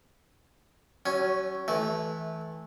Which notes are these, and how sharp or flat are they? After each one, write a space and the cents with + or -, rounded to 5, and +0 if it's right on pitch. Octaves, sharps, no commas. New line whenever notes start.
F#3 +40 C#4 +0
E3 -20 A3 -20